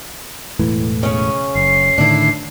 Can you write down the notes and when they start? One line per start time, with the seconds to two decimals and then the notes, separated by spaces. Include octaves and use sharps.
0.59 E1 A2 E3
1.03 C#3 C#4
1.55 F#1 C7
1.98 A2 D3 D#3 D4 E4